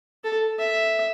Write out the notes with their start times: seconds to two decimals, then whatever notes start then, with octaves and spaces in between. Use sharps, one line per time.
0.24 A4
0.59 E5